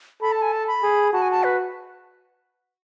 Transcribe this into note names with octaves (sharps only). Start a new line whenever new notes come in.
A4 B5
A5
G#5
A5
B5
G#4
F#4 A5
G#5
A5
B4